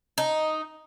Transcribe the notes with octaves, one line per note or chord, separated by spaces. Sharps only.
D#4